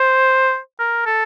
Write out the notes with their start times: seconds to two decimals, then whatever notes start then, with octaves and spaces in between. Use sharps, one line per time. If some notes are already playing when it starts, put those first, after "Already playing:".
Already playing: C5
0.79 A#4
1.06 A4